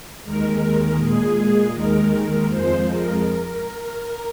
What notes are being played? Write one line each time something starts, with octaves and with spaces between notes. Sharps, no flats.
D#2 D#3 G#3 A#4
A#4
A#2 G#3 G#4
D#2 D#3 G#3 A#4
A#4
F2 F3 G#3 C5
A#4